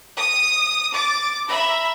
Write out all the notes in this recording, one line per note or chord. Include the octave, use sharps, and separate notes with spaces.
D#6
D6 A6
E5 A#5 B5